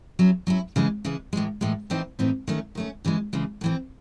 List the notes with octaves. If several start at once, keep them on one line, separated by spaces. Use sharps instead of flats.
F#3 C#4 E4
F#3 C#4 E4
C#3 E3 G#3
C#3 E3 G#3
A2 E3 G#3
A2 E3 G#3
A2 E3 C4 D#4
A2 E3 C4 D#4
D#3 A3 C#4
D#3 A3 C#4
C#3 E3 G#3
C#3 E3 G#3
A2 E3 C4